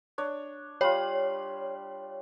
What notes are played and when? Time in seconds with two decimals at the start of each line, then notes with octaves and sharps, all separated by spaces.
0.18 D4 C#5
0.81 G3 F4 C#5